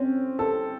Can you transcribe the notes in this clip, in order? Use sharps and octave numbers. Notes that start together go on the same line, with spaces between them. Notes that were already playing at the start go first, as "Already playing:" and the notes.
Already playing: C4 C#4
A4